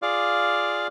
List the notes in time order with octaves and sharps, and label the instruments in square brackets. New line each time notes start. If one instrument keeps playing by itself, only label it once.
[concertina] F4 G#4 D5 F5 D6 F6